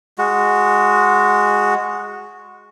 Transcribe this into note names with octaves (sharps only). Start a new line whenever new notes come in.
G#3 F#4